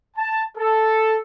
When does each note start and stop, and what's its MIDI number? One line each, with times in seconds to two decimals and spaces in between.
0.16 0.42 81
0.56 1.17 69